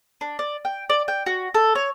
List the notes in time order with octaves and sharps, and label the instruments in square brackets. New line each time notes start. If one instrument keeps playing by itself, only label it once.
[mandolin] D4
D5
G5
D5
G5
F#4
A4
C#5